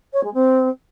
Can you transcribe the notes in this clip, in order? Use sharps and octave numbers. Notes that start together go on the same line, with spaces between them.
C#5
G#3
C4